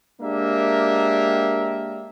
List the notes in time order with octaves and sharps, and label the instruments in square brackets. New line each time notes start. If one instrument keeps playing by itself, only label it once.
[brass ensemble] G#3 A#3 D4 G4 A#4 E5